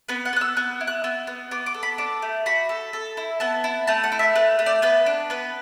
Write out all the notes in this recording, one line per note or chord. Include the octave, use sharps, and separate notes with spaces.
B3 B4
F#5
B3 F#6
E6
B3 F#6
E4
F#6
B3 E6
B3
B3 D6
D6
A4
B5
D4 D6
A3
F#4 B5
A4
A4
E4
B3 A5
E4
A3 A5
F#5
E4
E5
A3 B4
A3
D5
B3 B4
D4
B3 B4